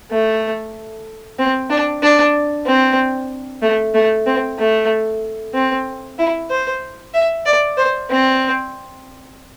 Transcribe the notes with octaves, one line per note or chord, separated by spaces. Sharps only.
A3
C4
D4
D4
C4
A3
A3
C4
A3
C4
E4
C5
E5
D5
C5
C4